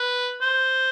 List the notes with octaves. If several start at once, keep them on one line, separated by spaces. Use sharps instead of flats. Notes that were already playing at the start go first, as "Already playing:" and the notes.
Already playing: B4
C5